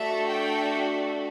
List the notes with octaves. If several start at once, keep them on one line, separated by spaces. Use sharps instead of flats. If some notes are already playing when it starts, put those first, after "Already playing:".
Already playing: A3 D4 F#4 A4 E5
G5